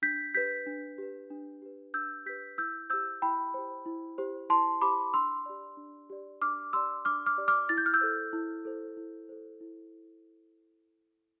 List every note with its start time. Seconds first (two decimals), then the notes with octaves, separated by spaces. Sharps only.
0.02 D4 G6 B6
0.34 G4 B4 G6 B6
0.66 D4
0.98 G4 B4
1.30 D4
1.62 G4 B4
1.94 D4 E6 G6
2.26 G4 B4 G6 B6
2.58 E4 E6 G6
2.90 G4 C5 E6 G6
3.22 E4 G5 B5
3.54 G4 C5
3.86 E4
4.18 G4 C5
4.49 E4 A5 C6
4.81 G4 C5 B5 D6
5.13 D4 C6 E6
5.46 G4 D5
5.77 D4
6.10 G4 D5
6.42 D4 D6 F6
6.73 G4 D5 C6 E6
7.05 D4 D6 F6
7.26 D6 F6
7.37 G4 D5
7.48 D6 F6
7.69 E4 A6
7.78 G6
7.86 F6
7.94 E6 G6
8.01 A4 C5
8.33 E4
8.65 A4 C5
8.97 E4
9.29 A4 C5
9.61 E4